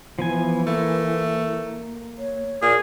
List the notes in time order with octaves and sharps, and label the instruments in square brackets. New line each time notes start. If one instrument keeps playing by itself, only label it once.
[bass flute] E3 [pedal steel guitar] F3 B3 G#5
[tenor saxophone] A3 [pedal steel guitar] A#3
[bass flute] C#5
[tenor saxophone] A#2 [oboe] G#4